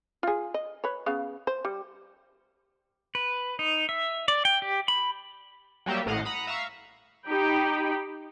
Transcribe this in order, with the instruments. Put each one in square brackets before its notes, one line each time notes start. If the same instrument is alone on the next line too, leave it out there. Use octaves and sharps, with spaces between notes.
[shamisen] F4 G#4
D#5
B4 C#5
C#3 B3 F5
C5
G3
[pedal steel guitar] B4
D#4
E5
D5
G5
G4
B5
[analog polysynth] F#3 G3 A#3 G4 E5
A1 A2 D#5 F5 F#5
F#5 A#5 B5 D#6
E5 F5 A#5 C#6 E6
[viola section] D#4 G4 G5 B5